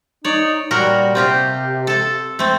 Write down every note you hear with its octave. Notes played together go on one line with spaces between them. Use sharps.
D#4 C#5 D5
A#2 G3 F#4 A#4
C3 C4 F4 G4
A4 A5
A3 C4